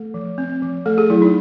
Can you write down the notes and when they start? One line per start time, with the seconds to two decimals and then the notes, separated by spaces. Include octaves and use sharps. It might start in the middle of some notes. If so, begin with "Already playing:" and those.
Already playing: A3 A4
0.14 F3
0.38 C4
0.62 F3
0.86 A3 A4
0.98 G#4
1.10 F#3 E4
1.22 D#4